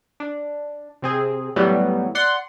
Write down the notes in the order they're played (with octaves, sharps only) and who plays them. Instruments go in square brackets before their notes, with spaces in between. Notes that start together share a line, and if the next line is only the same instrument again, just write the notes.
[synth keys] D4
C3 C4 G#4
A2 E3 F#3 G3 B3
D5 F#5 C6